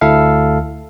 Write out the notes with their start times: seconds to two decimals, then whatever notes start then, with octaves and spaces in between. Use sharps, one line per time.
0.01 D2 E4 A4 E5 F5